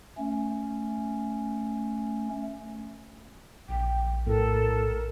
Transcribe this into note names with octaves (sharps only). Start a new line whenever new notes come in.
A3 C#4
A#1 G5
A2 A4 A#4